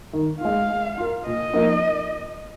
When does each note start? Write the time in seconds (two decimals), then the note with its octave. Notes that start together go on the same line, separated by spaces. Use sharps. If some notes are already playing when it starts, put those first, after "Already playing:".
0.13 D#3
0.41 G#3 F4 F5
0.70 G#3
0.98 F4 A#4
1.26 A#2 D#5
1.54 F3 A#3 D#4 A#4